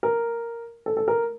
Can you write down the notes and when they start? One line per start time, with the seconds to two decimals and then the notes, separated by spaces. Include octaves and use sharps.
0.03 A#4
0.86 A4
0.97 A4
1.08 A#4